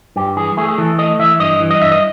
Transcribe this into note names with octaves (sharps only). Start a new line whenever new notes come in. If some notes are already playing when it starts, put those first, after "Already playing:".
G2 G4
E3 G#4
A3 G#4
G#4
E3 A4
A3 D#5
E3 E5
G2 D#5
E3
D#5
G2 E5
D#5